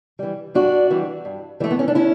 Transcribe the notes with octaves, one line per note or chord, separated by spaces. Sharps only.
E3 G3
G2 D4 F#4
E3 G3
G2
E3 G3 A3
B3
C#4
D4
C#4 E4